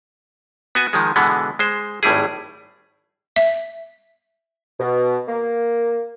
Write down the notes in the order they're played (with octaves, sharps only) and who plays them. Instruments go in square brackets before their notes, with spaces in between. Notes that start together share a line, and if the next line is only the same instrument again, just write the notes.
[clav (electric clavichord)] B3 F#4 G#5
D#3 F3 G#3
B2 D3 E3 G#3 B3
G#3 C5
G#1 A2 G3 E4 G#4
[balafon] E5
[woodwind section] B2
A#3